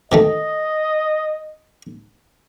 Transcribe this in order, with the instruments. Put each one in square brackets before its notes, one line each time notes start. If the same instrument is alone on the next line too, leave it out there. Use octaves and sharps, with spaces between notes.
[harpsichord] B2 D#3 A3 [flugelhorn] D#5